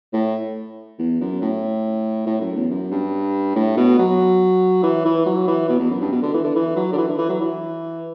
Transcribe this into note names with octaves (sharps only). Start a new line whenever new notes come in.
A2
E2
F#2
A2
A2
F#2
E2
F#2
G2
A2
B2
F#3
E3
E3
F#3
E3
B2
E2
F#2
G2
B2
D3
E3
D3
E3
F#3
D3
E3
D3
E3
F#3
E3